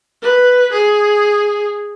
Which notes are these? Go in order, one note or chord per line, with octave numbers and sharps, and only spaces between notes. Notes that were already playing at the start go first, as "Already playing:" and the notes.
B4
G#4